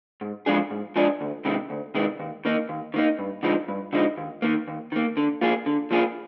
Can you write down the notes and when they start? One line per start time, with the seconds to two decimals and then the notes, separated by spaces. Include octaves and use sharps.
0.21 G#2
0.46 F3 G#3 D4 G#4
0.71 G#2
0.96 F3 G#3 D4 G#4
1.21 D2
1.45 C3 D#3 G#3
1.70 D2
1.95 C3 D#3 G#3
2.20 D#2
2.45 D#3 A#3 D#4
2.69 D#2
2.94 D#3 A#3 D#4
3.19 G2
3.43 D3 F3 G#3 D#4
3.68 G2
3.93 D3 F3 G#3 D#4
4.18 D#2
4.42 D#3 A#3
4.68 D#2
4.92 D#3 A#3
5.17 D3
5.41 F3 A#3 F4 G#4
5.66 D3
5.91 F3 A#3 F4 G#4